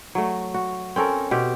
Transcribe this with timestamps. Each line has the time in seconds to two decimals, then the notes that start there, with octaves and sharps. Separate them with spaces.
0.15 F#3 A3
0.54 F#4
0.96 C4 C#4 A4 A#4
1.31 B2 C4 G4 E5